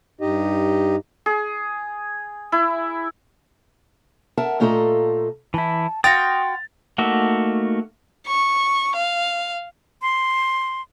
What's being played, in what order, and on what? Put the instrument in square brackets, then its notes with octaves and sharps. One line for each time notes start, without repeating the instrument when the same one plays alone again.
[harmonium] G2 D#4 G4 D#5
[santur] G#4
E4
[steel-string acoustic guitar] A#4 E5 F#5 A5
A#2 A3 F4 A4 D#5 A#5
[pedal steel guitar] E3 E4 [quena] A5
[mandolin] F#4 F5 G5 [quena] C6 [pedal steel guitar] D#6 [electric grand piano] A6
[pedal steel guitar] A3 A#3 D#4 F#4 E5
[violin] C#6
F5
[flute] C6